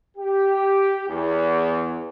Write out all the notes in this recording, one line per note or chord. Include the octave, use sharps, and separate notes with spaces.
G4
E2